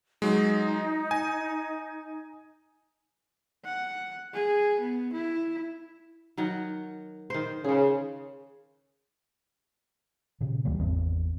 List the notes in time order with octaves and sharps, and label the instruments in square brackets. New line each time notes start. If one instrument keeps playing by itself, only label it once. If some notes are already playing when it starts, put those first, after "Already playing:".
[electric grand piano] F#3 G#3 [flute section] D#4
[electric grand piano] G#5
[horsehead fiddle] F#5
G#4
B3
E4
[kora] D#3 F#3 F#5
D#3 C5
[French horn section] C#3 [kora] G#4 C5
[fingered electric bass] A#2 C#3
D2 E3 G3 A#3
G#1 E2 C4